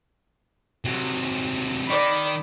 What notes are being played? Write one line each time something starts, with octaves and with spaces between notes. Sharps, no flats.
C3 F#3
D#3 D5 B5